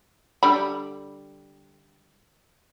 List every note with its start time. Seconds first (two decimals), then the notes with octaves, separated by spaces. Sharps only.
0.43 D3 G3 B5